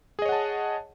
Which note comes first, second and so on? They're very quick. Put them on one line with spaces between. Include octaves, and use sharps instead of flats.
G#4 D#5 C#5 F#5 A5